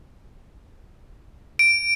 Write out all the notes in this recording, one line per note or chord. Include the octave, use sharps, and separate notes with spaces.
D7